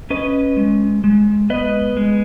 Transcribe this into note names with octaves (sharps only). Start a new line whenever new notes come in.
C#4 B4 D#5
G#3
G#3
B3 B4 D#5
G#3